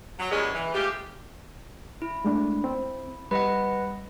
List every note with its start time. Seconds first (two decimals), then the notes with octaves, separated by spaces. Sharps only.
0.19 F#3
0.31 E2 A#2 G3 G#3 B3 C#4
0.54 E3
0.74 G#3 A3 F4 G4
2.02 E4
2.25 G#3 A3 D4
2.64 C4
3.31 G3 B4 D#5 F#5 B5